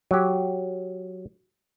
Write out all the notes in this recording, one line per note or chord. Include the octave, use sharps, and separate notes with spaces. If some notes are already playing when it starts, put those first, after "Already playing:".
F#3 G4